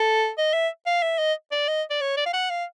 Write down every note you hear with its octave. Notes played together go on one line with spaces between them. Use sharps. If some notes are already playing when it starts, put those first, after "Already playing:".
Already playing: A4
D#5
E5
F5
E5
D#5
D5
D#5
D5
C#5
D5
F5
F#5
F5